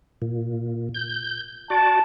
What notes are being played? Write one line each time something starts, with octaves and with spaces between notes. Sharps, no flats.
A#2
G6
F#4 D5 A5